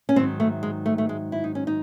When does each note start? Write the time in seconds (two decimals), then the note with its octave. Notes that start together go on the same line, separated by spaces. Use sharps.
0.09 C#4
0.16 G#2 D#3 F#3 C4
0.40 A3
0.63 G#3
0.86 A3
0.98 A3
1.09 G#3
1.32 E4
1.44 D#4
1.55 C#4
1.67 D#4